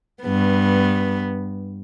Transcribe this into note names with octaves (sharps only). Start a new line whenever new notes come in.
G2 B3